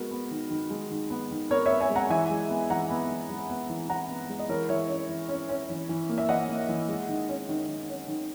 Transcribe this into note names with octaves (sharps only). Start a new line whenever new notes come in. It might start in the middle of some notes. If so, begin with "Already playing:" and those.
Already playing: G#3 B3 F#4 A#4
B3
D#3
D#3
G#3
D#3
B3
D#3
B3 A#4 C#5
B3 C#5 E5
E5 G#5
G#3
F#5 A#5
E3 E5 G#5
G#3
B3
E3 F#5 A#5
B3
E3
G#3
B3
E3
E3 F#5 A#5
B3
G#3
D#5
E3 A#4 C#5
E3 C#5 E5
C#4
E3
C#4
C#4
E3
E3
A#3
E5
E3 D#5 F#5
A#3
E3
G#3
D#3
C#4
D#3
D#3
C#4
D#3